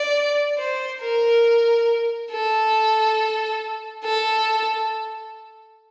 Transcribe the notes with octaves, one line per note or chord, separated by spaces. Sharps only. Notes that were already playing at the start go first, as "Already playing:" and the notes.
Already playing: D5
C5
A#4
A4
A4